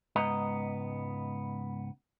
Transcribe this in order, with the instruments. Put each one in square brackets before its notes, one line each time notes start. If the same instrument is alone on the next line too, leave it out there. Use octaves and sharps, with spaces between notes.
[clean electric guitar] C#2 G#2 B3 D#5 A#5